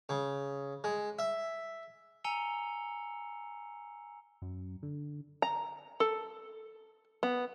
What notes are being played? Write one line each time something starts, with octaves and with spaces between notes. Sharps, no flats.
C#3
G#3
E5
G#5 A#5 E6 C#7 F7 G7
F#2
D3
A#5
A4
B3